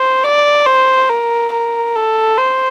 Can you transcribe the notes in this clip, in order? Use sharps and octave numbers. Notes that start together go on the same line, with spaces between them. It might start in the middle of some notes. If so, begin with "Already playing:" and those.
Already playing: C5
D5
C5
A#4
A#4
A4
C5